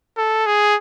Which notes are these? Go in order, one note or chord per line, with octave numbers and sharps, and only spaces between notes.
A4
G#4